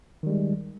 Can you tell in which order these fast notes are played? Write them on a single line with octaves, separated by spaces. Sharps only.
D#3 G3 G#3